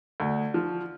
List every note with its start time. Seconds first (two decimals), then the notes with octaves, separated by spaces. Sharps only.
0.20 D2
0.54 F3